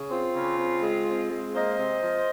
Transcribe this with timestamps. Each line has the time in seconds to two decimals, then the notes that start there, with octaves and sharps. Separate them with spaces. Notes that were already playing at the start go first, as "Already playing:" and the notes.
Already playing: C#3
0.11 C4 F4
0.35 C#3
0.59 C4
0.83 G#3
1.07 C4
1.31 G#3
1.54 A#3 C5 D#5
1.78 C3
2.02 F3